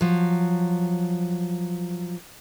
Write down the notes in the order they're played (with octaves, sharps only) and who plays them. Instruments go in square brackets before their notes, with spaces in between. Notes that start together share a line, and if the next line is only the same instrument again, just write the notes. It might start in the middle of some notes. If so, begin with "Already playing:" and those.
[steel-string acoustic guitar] F3 F#3